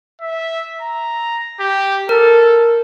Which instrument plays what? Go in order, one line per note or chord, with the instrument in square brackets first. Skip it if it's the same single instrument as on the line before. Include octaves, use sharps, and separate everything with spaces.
[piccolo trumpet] E5
A#5
G4
[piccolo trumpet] A4 [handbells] A#4